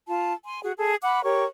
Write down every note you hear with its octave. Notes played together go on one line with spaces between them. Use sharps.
F4 A5
G#5 C6
F#4 G#4
G#4 A4 A5
F#5 B5 D6 F#6
G4 A#4 C#5 C#6